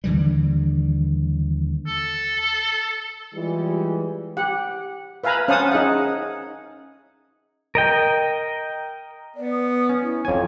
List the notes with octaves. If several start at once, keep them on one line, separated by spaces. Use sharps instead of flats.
D#2 D3 E3 G3
A4
E3 G3 G#3 F4
G4 F#5
B4 E5 F5 G#5 A#5 B5
C#4 C5 F5 F#5 A5 D#6
D#4 G#4 E5 F#5
A#4 D#5 G5
B3 D5
D#6
C#4
E4
F2 C#5 G#5